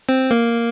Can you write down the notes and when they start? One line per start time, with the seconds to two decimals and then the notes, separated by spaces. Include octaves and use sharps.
0.09 C4
0.31 A#3